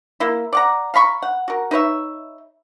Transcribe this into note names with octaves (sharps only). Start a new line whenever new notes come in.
A#3 E4
D5 F#5 A#5
F5 A#5 B5 C#6
F#5
F#4 A#4
D#4 B4 C#5 E5